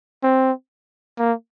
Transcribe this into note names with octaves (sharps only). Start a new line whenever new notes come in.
C4
A#3